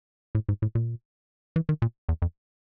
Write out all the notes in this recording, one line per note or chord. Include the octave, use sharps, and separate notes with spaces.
A2
G#2
A2
A#2
E3
D#3
A#2
E2
F2